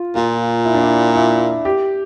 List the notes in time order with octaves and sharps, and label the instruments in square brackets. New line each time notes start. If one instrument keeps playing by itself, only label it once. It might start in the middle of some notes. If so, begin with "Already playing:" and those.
Already playing: [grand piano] F4
[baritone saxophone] A#2 [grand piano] F4
[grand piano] E4
D4
E4
E4
G4